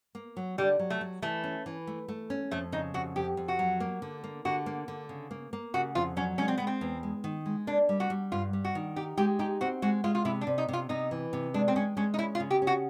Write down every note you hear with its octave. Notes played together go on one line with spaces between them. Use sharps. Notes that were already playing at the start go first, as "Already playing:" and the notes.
A#3
F#3
D3 G3
F#3
A3
F#3
E3 A3
C#4
E3
A3
A3
C#4
F2 A3
C#3 D#4
F2 F#4
F2 G4
F2
F#4
F#3
A#3
D3
A#3
D3 F#4
A#3
D3
C#3
A#3
A#3
C#3 F#4
F2 F4
F#3 C#4
G#3 C#4
C4
G#3 B3
C4
E2
G#3
D#3
G#3
A#3 D4
G3
F#4
G3
G2 F4
G3
F#4
D#3
D#4 G4
G#3 G4
D#4 G4
C4 F#4
G#3 F#4
G#3 F4
F4
C3 E4
D4
C3
D#4
C3 F4
C3 D#4
E3
C3
G#3 D4
C4
G#3 C#4
G#3 C#4
D#4
C#4 E4
F4
C#3
G4
C#4
F#4